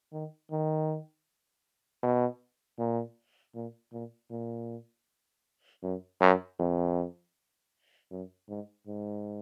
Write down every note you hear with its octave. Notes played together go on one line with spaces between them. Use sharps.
D#3
D#3
B2
A#2
A#2
A#2
A#2
F#2
F#2
F2
F#2
G#2
G#2